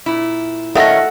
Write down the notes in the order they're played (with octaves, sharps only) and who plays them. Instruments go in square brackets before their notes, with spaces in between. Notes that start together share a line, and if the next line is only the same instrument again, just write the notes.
[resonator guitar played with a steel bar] A#2 E4
[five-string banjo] D#3 A3 C#4 [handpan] A4 F#5 [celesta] E5 A#6